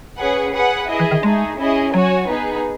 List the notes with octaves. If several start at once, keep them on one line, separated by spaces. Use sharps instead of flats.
C#4 G#4 B4 F#5
G#4 B4 F#5
E4 G#4 D#5
E3
D#3
G#3 A3 D#4 G#4
C#4 E4 G#4 D#5
F#3 F#4 C#5 G#5
B3 D#4 G#4 B4